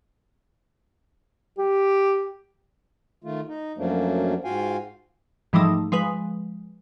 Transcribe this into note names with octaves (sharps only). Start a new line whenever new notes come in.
G4
D#3 A3 F4
D#4
F#2 F3 F#3 A3 A#3 D4
G#2 F4 F#4 F5 G5 G#5
G#2 E3 F3 G3 A3 D#4
F3 G#3 B4